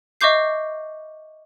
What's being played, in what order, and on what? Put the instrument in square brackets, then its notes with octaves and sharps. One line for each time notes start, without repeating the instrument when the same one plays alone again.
[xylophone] D#5 E5 C#6 D6 G6 C7